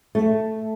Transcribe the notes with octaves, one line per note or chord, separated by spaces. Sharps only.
A3